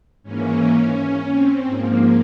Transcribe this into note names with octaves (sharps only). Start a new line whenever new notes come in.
G#2 E3 A#3 C#4
C4
G#2 F3 A#3